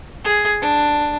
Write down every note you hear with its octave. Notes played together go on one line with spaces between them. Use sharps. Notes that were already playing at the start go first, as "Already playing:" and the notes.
G#4
D4